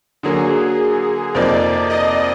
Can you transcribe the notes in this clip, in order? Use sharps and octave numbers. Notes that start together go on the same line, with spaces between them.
D3 F#3 A#3 G#4
F2 C3 F3 A#3 D#4 D5
D#5